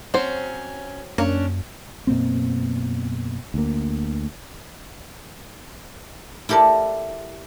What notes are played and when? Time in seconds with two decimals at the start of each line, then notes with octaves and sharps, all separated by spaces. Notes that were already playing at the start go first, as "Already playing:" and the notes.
0.14 F#3 C4 C#4 C5
1.18 F#2 A#3 C#4 D4
2.07 F#2 B2 A#3 C4
3.54 D2 A#3
6.49 E4 G4 A4 A#4 D5